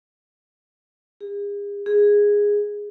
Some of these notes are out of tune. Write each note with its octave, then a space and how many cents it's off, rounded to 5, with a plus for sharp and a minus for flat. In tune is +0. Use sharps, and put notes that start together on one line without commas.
G#4 -40
G#4 -10